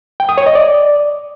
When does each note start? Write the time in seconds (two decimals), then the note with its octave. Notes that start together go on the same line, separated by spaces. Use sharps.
0.20 G5
0.29 D#6
0.38 C#5
0.46 D#5
0.55 D5